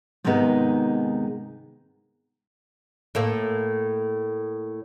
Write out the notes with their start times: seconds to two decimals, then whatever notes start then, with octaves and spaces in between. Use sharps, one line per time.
0.24 G#2 C3 D#3 G#3 B3 D#4
3.15 A2 A3 A#3